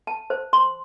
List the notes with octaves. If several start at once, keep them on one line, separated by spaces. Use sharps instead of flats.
A5
C5
C6